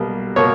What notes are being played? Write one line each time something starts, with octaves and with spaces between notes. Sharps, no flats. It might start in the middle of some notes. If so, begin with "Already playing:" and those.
Already playing: B1 B2 G3 A#3
B2 A#3 C#5